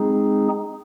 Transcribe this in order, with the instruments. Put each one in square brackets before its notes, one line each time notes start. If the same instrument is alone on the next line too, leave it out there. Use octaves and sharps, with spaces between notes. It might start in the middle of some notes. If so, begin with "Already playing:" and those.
Already playing: [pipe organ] G#3 C4 D#4 G#4